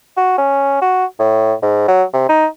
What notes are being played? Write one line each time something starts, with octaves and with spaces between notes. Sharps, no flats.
F#4
C#4
F#4
A2
G#2
F#3
C3
D#4